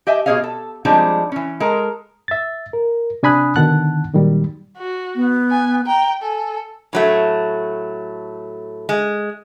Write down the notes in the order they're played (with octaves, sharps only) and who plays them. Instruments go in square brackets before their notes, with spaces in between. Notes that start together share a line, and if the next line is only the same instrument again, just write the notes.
[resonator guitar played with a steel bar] G4 D#5 E5 G#5
B2 F4 G#4 C#5 D#5 F5
A4
F3 G3 G#3 C4 D4 D#4
E3 C#4
G#3 A4 A#4
[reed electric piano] E5 A6
A#4
C3 D4 G#5 B5 D#6 F#6
B2 D3 D#3 F#5 A5 F#6
A#2 D#3 F#3 G3
[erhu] F#4
[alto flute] B3
[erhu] G#5
[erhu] G5 [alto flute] A#5
[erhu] A4 [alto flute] G#5
[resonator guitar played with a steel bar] A2 F#3 A3
G#3